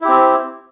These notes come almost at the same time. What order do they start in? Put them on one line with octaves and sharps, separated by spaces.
E4 G4 C4